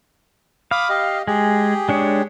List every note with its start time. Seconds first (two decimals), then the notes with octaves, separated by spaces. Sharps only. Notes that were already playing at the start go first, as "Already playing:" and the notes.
0.71 F5 B5 D6 D#6
0.89 G4 D#5
1.27 G#3 G4 G#4
1.89 G#3 D4 C#5